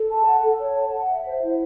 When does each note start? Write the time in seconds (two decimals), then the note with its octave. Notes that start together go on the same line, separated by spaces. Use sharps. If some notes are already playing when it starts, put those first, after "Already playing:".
Already playing: A4
0.10 A5
0.26 F#5
0.43 A4
0.60 C#5
0.76 A5
0.93 F#5
1.10 E5
1.26 C5
1.43 E4